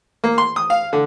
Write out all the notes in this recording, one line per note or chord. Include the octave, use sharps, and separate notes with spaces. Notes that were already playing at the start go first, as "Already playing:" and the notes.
A#3
C6
D#6
F5
D3